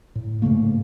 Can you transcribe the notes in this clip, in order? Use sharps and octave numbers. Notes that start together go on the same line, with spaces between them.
A2
G#2 C#3 A3 A#3